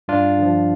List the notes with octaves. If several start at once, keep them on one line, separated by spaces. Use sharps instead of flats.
G2 D4 F4
D3 F3